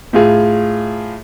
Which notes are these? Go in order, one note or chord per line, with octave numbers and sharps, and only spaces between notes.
A2 F4 G#4